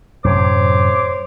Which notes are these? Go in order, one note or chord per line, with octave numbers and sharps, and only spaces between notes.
F#2 A2 C3 C5 C#5 D6